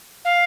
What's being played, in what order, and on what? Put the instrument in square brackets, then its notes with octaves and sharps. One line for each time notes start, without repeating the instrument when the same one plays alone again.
[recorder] F5